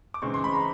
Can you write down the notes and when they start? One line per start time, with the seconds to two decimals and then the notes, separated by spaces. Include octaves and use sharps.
0.14 D6
0.22 C#3 E3 G#3 C4 D#4 C#6
0.34 C6
0.44 B5
0.53 A#5